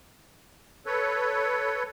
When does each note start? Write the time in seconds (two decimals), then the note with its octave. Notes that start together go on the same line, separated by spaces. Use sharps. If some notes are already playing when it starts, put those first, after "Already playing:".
0.86 A4 B4 C#5